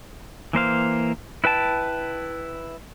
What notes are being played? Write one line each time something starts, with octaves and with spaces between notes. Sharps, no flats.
E3 A#3 C5 F5
E4 B4 G5 A5